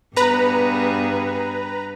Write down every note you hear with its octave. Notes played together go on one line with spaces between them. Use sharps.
G2 B3 G#4 B4 A#5